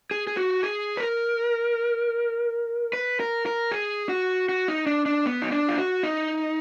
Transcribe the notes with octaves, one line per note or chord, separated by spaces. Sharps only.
G#4
G#4
F#4
G#4
B4
A#4
B4
A#4
A#4
G#4
F#4
F#4
D#4
D4
D4
B3
D#4
D4
F4
F#4
D#4